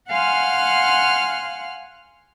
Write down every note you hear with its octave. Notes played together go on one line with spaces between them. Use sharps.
F5 F#5 G#5 C6 F6 F#6